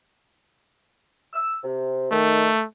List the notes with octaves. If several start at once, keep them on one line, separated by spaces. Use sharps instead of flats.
E6
C3
D#3 A3